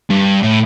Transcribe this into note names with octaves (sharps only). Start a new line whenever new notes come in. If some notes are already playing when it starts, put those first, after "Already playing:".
G2
A2